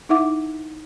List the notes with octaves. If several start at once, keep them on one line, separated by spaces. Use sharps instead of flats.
D#4 E4 E5 F#5 D6